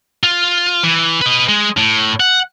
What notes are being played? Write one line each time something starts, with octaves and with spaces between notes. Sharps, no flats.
F4
E3
B4 D#5
G#3
A2
F#5